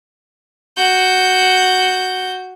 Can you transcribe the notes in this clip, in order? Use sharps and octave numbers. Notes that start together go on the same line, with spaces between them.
F#4 G6